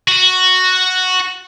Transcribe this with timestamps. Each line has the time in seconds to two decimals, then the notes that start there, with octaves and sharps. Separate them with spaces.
0.08 F#4